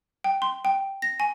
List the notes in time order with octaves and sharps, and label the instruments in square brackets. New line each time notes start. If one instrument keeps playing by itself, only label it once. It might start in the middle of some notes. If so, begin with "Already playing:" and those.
[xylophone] G5
C6
G5
A#6
G#5